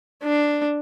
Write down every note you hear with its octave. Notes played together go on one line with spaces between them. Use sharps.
D4